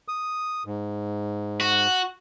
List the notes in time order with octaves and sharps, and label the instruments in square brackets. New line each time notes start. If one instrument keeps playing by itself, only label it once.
[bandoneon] D#6
G#2
[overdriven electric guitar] F#4